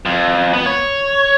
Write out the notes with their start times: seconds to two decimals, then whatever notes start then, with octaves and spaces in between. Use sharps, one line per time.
0.05 F2
0.53 B3
0.66 C#5